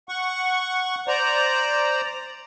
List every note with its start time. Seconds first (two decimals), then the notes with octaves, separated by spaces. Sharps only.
0.09 F#5 C#6
1.08 C5 D5 A#5